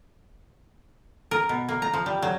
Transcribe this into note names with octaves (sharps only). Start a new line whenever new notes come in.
A#4
B2
A#3
A#5
F3
G3
F#3